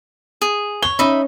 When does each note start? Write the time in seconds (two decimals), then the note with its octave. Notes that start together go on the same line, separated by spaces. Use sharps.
0.42 G#4
0.83 C#5 G7
0.99 C#4 D#4 E5 B5